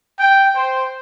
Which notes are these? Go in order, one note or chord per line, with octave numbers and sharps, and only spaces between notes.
G5
C5